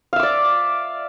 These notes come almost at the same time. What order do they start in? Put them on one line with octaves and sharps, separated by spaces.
F5 E5 D6 D5